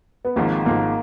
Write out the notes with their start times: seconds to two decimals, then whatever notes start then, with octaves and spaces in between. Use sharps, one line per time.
0.25 B3
0.36 G#1 G#2 F3 A#3
0.65 G#1 G#2 F3 A#3